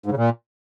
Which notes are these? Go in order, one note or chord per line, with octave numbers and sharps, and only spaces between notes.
G#2
C#3
A#2